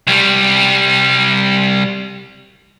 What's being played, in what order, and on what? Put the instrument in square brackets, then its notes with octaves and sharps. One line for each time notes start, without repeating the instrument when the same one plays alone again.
[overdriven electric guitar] C2 G3